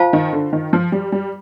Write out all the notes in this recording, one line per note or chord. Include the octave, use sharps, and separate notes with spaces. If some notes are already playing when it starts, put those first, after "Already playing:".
Already playing: F4 C5 F5 A5
D#3
D3
D#3
F3
G3
G3